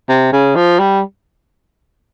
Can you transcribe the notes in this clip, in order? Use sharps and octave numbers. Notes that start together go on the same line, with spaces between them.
C3
C#3
F3
G3